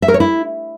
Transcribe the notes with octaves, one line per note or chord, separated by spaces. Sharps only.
E5
A#4
C#5
E4